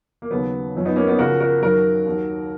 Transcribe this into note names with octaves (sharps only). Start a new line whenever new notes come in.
A#3
D#2 C#3 F#3 B3
F#2 F3 C#4
B3 D#4
A#3 C#4
B3 D#4
C#2 C#3 F3 F#4 A#4
F#4 A#4
F#2 D#3 F#3 F#4 A#4
D#2 D#3 F#3